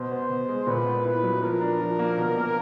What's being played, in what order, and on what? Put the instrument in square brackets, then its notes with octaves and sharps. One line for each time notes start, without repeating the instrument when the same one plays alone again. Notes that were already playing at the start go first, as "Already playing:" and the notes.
Already playing: [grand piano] B2 [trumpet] C5
[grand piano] B3
B2
G#3
[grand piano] A#2 [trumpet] B4
[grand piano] B3
[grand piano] E4 [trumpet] B4
[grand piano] F#3
[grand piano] F3 [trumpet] A#4
[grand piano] D4
F3
A#3
B2
A#3